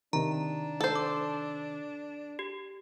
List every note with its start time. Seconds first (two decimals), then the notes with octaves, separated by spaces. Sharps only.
0.13 C3 D#3 D4 A#5
0.81 A4 C5
0.95 D6
2.39 G4